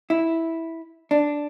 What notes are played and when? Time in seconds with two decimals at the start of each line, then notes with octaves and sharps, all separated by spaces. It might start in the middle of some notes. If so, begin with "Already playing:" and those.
0.10 E4
1.11 D4